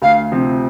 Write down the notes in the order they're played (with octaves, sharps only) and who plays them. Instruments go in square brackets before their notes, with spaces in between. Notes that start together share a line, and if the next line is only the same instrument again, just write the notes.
[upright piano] D2 [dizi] F5
[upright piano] C3 F3 C4